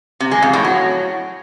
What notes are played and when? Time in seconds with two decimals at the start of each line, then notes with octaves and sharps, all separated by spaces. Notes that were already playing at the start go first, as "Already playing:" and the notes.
0.20 C3
0.31 G#3
0.42 F2
0.53 A2
0.64 F#3